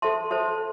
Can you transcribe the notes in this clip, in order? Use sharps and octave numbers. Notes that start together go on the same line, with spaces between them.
A4 C5 E5 A5 C6
A4 C5 E5 A5 C6